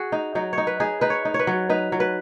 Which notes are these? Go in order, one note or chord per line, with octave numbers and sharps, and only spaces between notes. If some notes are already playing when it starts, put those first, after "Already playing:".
Already playing: F#4 G#4
D#4
F#3 D#4
D#4 C#5
B4
D#4 G#4
D#4 B4
C#5
D#4
C#5
B4
F#3
D#4 B4
F#3
B4